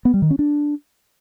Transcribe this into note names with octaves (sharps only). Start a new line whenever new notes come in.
B3
G3
D#3
C#4
D4